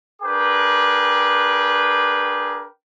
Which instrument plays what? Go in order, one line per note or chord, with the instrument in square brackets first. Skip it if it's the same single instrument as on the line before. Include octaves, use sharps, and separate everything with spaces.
[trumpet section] D4 G#4 A#4 B4 G5 D6